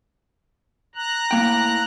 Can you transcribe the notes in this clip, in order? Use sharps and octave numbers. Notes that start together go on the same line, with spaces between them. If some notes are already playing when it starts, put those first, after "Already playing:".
A#5 F#6
A2 A#3 G5